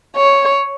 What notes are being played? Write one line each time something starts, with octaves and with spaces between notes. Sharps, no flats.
C#5